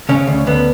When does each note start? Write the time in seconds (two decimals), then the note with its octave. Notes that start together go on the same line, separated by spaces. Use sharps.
0.09 C#3 C#4
0.27 D2
0.47 D2 B3